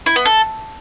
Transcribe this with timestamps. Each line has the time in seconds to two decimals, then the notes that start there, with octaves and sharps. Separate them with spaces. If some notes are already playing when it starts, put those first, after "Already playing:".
0.06 E4
0.16 B3
0.25 A4